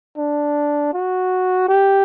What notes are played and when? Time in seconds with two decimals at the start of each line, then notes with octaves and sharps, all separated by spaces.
0.18 D4
0.94 F#4
1.69 G4